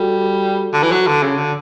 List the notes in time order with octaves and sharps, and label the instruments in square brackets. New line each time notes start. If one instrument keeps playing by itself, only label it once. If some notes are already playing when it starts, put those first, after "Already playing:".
Already playing: [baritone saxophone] G3 [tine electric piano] F#4 A4
[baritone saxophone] D3
E3
F#3
D3
C#3
D3